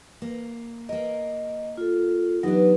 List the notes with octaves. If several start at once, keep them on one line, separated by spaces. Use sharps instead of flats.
A#3
A#3 A#4 D#5
F4 A4
E3 F#3 B3 D4 D#4 G4